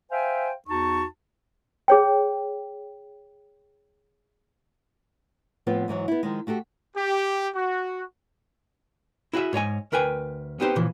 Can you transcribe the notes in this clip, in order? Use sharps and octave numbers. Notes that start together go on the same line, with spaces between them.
C5 E5 F5 G5 G#5
E2 D#4 F#4 A5 C#6
G#4 C#5 G5
A2 F3 B3 C4 F4 B4
G#2 D3 E3 F#3
B3 E4
D#3 F3 G#3
A3 F#4 G4 A4
G4
F#4
E4 F#4 G#4 E5
G#2 C#5 D#5 G#5
D2 A#4 B4 G5 G#5
B3 C4 D#4 G4 B4 C5
A#2 C#3 E3 F3